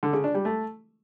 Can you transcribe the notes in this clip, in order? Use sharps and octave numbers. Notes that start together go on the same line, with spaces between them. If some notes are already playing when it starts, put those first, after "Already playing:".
D3
C#3
D4
G3
A3